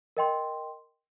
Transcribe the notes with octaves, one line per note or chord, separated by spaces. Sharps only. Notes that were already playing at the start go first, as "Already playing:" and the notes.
A#4 D#5 G5 C6